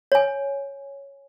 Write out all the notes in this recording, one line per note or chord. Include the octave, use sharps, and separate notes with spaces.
C#5 G#5